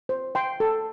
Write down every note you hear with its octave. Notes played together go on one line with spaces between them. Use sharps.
C5
G5 C6
A4